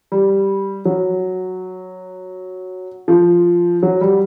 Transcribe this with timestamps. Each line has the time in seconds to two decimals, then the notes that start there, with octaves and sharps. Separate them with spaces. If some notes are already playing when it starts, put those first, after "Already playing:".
0.12 G3
0.85 F#3
3.08 F3
3.83 F#3
4.01 G3